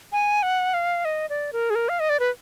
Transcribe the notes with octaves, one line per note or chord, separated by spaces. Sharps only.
G#5
F#5
F5
D#5
D5
A#4
G#4
A#4
F5
D#5
D5
B4